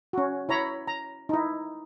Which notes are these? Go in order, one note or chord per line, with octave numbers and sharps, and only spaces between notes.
C#4 F#4
E4 C#5 A#5 B5
A#5
D#4 E4